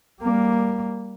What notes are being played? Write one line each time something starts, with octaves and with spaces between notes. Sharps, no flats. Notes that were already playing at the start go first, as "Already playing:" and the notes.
G3 A#3